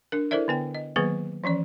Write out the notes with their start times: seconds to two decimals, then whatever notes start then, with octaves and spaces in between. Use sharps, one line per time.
0.12 D4 A#4
0.31 E4 A4 A#4 C5 D5 E5
0.48 D3 B3 G5
0.74 D#5
0.96 D#3 F#3 A#3 B3 G#4 B4
1.44 E3 F3 C#4 D5